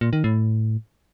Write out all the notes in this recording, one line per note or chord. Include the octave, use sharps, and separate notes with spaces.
A#2
D#3
A2